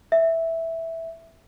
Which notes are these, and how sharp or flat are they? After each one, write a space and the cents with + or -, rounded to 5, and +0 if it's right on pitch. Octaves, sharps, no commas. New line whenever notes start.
E5 -5